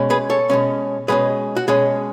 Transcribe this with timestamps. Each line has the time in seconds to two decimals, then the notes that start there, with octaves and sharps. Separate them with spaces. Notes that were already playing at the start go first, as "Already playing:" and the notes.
Already playing: B2 G#3 C#4
0.10 G#4 B4
0.30 A4 C#5
0.50 B2 G#3 C#4
1.08 B2 G#3 C#4 G#4 B4
1.56 F#4
1.68 B2 G#3 C#4 G#4